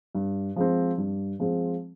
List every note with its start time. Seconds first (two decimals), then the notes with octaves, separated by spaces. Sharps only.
0.15 G2
0.56 F3 G#3 C4
0.98 G2
1.40 F3 G#3 C4